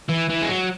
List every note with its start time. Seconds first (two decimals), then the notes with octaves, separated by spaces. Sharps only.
0.09 E3
0.29 E3
0.42 G#3
0.49 F#3